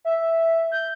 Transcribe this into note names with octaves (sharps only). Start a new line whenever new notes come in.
E5
G6